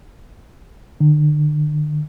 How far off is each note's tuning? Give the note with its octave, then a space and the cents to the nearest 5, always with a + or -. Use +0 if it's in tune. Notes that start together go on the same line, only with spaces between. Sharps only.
D3 +40